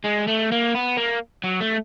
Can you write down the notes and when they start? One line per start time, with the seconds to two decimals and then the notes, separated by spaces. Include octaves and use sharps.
0.05 G#3
0.28 A3
0.52 A#3
0.75 B3
0.97 A#3
1.44 F#3
1.61 A3